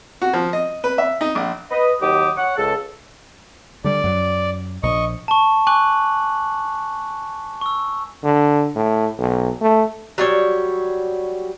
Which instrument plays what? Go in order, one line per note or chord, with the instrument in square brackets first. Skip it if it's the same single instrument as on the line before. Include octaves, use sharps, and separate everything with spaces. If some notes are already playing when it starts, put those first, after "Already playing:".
[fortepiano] F#4
F3
D#5
B4
E5
D#4
A#1
[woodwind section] B4 D#5
D#2 D#3 F#3 G4 D6 D#6
C#5 F#5
C#2 A4
[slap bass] D3 G3 [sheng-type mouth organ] D5
[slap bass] F#2 F#3
[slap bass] A#1 [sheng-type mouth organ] D#5 C#6
[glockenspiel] A5 C#6
G#5 C#6 D6 F#6 F#7
C#6 E6
[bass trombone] D3
A2
B1
A3
[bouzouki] F#3 G3 C#5